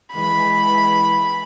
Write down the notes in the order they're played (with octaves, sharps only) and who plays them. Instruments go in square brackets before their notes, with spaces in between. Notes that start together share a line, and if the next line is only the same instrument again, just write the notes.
[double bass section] E3 G#3 [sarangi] B5